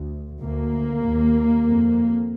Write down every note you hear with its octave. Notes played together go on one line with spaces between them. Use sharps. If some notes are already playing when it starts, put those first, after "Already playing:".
Already playing: D2
D2 A#3
D#2
F2